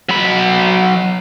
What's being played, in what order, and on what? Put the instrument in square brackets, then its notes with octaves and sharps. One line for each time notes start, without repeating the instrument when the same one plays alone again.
[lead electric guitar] F#3 B5